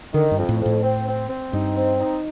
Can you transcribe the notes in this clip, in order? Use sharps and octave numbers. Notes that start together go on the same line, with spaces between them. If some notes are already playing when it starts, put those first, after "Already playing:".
D3 D#3
G2
F2
A2
F2
A2
C4
C4
C4
G2 D#4
C4
D#4